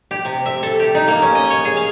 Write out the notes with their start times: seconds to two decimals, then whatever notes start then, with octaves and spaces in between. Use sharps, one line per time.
0.11 G4
0.25 C3
0.46 E5
0.63 A4
0.80 G4
0.95 D#4
1.08 A#3
1.22 C#4
1.35 D#5
1.50 C#5
1.65 G#4
1.77 F5